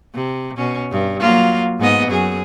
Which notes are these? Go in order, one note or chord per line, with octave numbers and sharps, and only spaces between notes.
C3
B2 C#4
G2
F#3 A#3 F4
G#2 B3 D#5
F#2 G#4